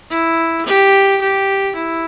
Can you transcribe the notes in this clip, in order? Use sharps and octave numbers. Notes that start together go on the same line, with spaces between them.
E4
G4
G4
E4